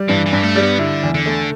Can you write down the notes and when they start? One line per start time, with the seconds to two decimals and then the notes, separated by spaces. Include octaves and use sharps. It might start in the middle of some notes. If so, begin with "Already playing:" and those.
Already playing: G3
0.09 G2 E3
0.26 E3
0.32 G2
0.43 A3
0.55 G3
0.62 B3
0.79 D3 E4
1.03 E2
1.14 D3
1.26 A3